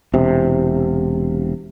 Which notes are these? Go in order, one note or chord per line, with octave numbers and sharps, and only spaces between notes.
E1 C3